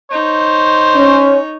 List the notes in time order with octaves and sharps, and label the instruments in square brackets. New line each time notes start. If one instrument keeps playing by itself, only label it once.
[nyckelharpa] D#4 C#5 [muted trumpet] C5
[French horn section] C#4